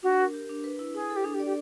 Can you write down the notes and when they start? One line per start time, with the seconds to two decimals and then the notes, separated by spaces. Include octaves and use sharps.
0.03 D4 F#4
0.19 A#4
0.34 G4
0.49 D4
0.64 B4
0.79 E4
0.94 E4 G#4
1.10 A4
1.16 G4
1.24 D4 G#4
1.34 G4
1.40 D5
1.45 G4